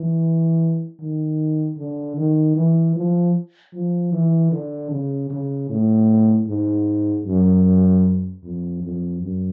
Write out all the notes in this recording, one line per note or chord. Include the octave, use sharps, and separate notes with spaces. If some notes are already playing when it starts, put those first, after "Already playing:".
Already playing: E3
D#3
D3
D#3
E3
F3
F3
E3
D3
C#3
C#3
A2
G#2
F#2
F2
F2
F#2